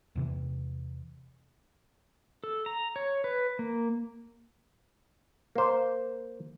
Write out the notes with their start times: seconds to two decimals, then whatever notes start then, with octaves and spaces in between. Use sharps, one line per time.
0.15 E2 C3 E3
2.44 A4
2.66 A#5
2.96 C#5
3.24 B4
3.59 A#3
5.56 A#3 C5